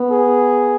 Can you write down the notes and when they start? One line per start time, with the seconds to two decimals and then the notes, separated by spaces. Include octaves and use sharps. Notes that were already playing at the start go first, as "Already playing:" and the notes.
Already playing: B3
0.11 G#4